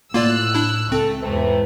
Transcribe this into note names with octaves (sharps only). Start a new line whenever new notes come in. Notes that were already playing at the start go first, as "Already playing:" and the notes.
A2 A#3 F4 D5 E6 F#6
D4 E4
C#2 A3 C4 A4
E2 G#2 C3 A3 B4